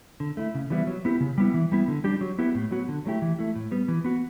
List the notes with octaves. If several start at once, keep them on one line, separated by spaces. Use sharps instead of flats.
D3
A3 E4
C#3
E3 G3 B3 E4
F#3
B3 E4 G4
C#3
G3 B3 E4
E3
G3 B3 E4
D3
G3 D4 G4
F#3
B3 E4 G4
A2
F#3 B3 F#4
D3
F#3 A3 E4 G4
E3
A3 E4
A2
G3 B3
E3
B3 F#4